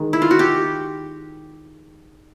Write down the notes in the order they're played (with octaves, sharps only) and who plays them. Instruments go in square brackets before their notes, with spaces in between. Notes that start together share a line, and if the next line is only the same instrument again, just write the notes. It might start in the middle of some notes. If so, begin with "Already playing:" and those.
Already playing: [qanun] D#3 G#3
E4
F4
F#4
G4